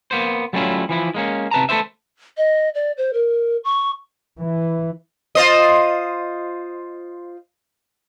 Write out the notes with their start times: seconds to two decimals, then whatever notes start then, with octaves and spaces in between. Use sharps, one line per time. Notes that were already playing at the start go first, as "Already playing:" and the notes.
0.11 A#3 B3 C5
0.53 F#3 G3 A3 C#4 E4 F4
0.89 E3 F3 E4
1.14 G#3 A#3 C#4
1.51 C3 B4 A5 A#5
1.69 A3 A4 B4 C5 E5
2.37 D#5
2.75 D5
2.98 C5
3.13 A#4
3.64 C#6
4.40 E3
5.35 F4 C5 D#5